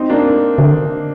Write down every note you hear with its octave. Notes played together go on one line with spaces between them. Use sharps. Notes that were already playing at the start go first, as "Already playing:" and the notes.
Already playing: C4 D#4
A#3 D4
D3